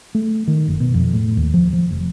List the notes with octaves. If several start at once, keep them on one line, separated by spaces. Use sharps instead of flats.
A3
D#3
F#1
B2
F2
A2
D#2
F3
F3
F1